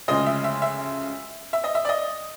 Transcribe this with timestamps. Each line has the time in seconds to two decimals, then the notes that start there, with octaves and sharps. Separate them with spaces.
0.08 D2 C#3 F3 G#3 D#5
0.26 E5
0.44 E5
0.62 E5
1.53 E5
1.64 D#5
1.75 E5
1.85 D5
1.89 D#5